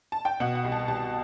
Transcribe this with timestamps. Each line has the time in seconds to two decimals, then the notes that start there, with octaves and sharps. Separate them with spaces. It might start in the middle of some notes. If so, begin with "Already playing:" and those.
0.12 A5
0.25 G5
0.40 B2 F#5
0.55 F#5
0.64 C2
0.72 A5
0.88 C2 A5